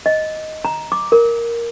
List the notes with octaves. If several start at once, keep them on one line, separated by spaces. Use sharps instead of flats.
D#5
A#5
D6
A#4